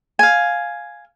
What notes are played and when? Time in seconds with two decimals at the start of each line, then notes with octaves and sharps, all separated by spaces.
0.19 F5 G#5